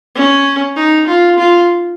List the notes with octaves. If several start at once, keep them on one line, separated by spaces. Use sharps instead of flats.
C#4
D#4
F4
F4